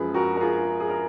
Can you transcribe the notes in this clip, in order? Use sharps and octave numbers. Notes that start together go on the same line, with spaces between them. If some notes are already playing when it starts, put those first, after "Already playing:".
Already playing: F#2 F3 G#3 G#4 B4
F#4 A#4
A#4
F4 G#4
G#4
A#4